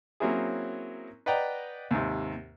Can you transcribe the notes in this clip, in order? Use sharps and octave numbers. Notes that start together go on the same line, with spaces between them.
F#3 A#3 C4 C#4 E4 G#4
B4 D5 D#5 F#5 G5 A#5
D#2 G#2 C3